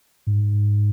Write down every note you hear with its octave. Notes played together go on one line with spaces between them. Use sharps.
G#2